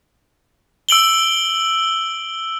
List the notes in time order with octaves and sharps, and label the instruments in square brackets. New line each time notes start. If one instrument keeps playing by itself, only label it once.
[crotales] E6 D7 F#7 G7